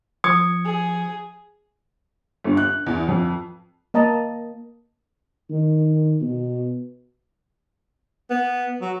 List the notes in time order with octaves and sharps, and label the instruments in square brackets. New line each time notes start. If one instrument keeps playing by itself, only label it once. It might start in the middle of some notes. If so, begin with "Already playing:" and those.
[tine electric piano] F3 G#6 C#7 [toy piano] D#6
[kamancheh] G#4
[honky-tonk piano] G1
F#6
E2
F2
[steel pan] A#3 D#5 A5 A#5
[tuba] D#3
B2
[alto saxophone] B3
F#3